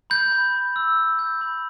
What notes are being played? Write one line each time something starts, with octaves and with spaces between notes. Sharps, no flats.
B5 G6
B5
B5
E6
E6
G6
B5